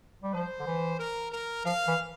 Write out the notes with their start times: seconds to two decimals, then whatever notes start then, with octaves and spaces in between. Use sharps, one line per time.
0.23 G3
0.33 F3 C5
0.60 D3
0.67 E3
1.00 A#4
1.32 A#4
1.65 F3 F5
1.88 E3